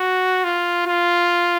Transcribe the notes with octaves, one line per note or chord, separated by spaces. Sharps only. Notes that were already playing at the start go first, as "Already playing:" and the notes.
Already playing: F#4
F4
F4